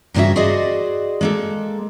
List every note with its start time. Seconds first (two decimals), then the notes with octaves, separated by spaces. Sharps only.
0.14 G2 C#3 A#3 C#4 F#4 E5
0.36 F#4 G#4 C5 D5 D#5
1.21 G#3 A#3 A4